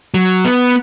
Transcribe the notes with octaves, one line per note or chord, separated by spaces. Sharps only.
F#3
B3